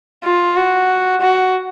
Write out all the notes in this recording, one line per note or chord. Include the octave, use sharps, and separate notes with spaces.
F4
F#4
F#4